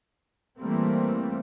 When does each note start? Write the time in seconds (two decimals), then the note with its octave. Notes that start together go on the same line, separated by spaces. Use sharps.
0.58 E3 G3 A3 A#3 C4